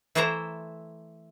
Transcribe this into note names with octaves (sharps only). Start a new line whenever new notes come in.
E3 A3 E4 C5 E5 A#5